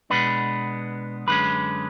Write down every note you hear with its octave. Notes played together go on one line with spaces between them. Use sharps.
B2 G#3 B3 D4 B4
F#2 D3 G#3 C#4 B4